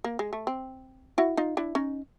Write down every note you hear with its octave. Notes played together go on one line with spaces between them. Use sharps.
A#3
G#3
A3
C4
E4 F#4
D#4 F4
D4 E4
C#4 D#4